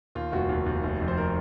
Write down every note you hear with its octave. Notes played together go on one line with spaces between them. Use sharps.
D#2 F4
F1 F#4
D#2
D#2
F1
F2
C5
A#4